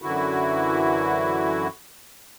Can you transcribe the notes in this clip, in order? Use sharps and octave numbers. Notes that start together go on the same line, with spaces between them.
F#2 D3 E3 E4 F#4